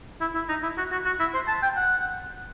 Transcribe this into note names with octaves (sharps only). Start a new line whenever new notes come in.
E4
E4
D#4
E4
F#4
F#4
F#4
E4
C5
A5
G5
F#5